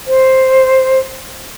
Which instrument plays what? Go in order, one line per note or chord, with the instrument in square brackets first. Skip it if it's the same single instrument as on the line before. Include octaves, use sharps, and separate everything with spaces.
[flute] C5